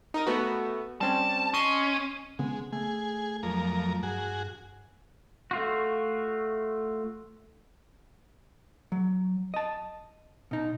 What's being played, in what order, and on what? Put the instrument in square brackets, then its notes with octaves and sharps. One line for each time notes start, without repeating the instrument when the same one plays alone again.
[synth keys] D#4 A#4 D#5
A3 B3 F#4
[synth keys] G3 C4 C#4 [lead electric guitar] A5
[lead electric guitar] C#4 [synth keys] D#5 C6
[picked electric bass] C#3 B3 [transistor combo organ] G#3
[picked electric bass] A3 [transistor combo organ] G#4
[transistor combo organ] F2 A#4 [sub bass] F#3
[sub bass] G2 [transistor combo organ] F#4 G#4
[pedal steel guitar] A3 F4 F#4
[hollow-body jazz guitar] F#3
D#5 A5
B2 D#4